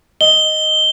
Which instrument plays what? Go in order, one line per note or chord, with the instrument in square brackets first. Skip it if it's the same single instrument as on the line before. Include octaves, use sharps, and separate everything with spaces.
[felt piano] D#5 [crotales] G7